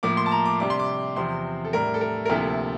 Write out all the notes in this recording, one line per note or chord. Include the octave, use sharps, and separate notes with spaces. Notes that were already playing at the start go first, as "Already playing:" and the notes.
A2 F3 A#3 D6
C6
A5
A#5
D6
C3 G3 D4 D6
C6
D6
E2 C3 F3 C4 C6
A4
A2 G3 D4 A#4
A4
A#4
A#4
D2 C3 F3 A#3 E4 A4